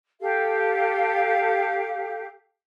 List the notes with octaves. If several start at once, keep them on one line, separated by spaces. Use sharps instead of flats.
G4 A4 F5